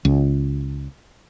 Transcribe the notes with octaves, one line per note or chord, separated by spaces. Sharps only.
C#2